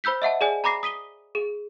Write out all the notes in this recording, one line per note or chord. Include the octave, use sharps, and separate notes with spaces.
C5 B5 E6 G6 B6
D#5 E5 F#5 A5
G#4 D5 G#5
A#5 B5 D6 A#6 C7
D#6 B6 D#7 G7
G#4